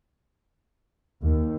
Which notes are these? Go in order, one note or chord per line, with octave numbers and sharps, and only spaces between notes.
D#2